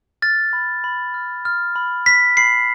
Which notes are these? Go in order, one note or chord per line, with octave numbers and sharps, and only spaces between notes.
F6 A6
B5
B5
F6
F6
B5
F6 B6
B5 C7